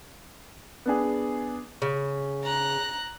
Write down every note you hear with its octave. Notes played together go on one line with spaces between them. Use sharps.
B3 D4 G#4
C#3
A#5 F#6